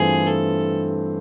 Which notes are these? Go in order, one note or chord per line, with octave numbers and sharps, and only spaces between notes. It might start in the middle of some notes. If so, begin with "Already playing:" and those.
Already playing: G2 E3 A3 C4 F4 G#4
A4